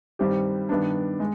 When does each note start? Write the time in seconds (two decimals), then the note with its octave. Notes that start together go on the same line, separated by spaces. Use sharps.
0.19 G2 D#3 G3 C4 G4
0.69 G2 D#3 B3 D4
1.20 G#3